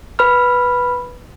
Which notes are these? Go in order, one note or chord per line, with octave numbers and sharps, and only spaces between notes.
B4 B5 F6